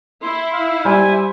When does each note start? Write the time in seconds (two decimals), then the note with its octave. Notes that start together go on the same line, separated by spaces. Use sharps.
0.23 E4 C6
0.53 F5
0.85 G3 C5 G#5